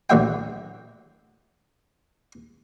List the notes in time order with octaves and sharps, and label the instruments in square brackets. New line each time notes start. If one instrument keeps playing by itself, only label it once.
[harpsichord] A1 D2 F#3 E5 G5